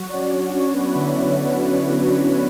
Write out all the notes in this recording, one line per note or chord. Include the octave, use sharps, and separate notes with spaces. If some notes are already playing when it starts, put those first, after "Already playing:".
Already playing: F#3 F#4
D5
C#4 C#5
D4 D5
C#4 C#5
B3 B4
E4
D3 D4